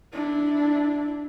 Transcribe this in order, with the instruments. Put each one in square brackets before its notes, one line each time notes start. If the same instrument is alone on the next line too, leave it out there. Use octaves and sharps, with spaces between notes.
[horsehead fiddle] D4 E4